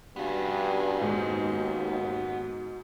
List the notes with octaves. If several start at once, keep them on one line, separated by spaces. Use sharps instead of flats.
G2 B3 C#4 F#4
D#2 G#2